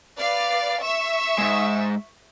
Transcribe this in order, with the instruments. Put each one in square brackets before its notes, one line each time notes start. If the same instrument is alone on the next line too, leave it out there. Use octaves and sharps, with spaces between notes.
[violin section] B4 D5 F5
E5 C#6 E6
[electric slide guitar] G#2 C#3 G#3